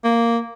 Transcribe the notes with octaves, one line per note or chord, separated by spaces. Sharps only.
A#3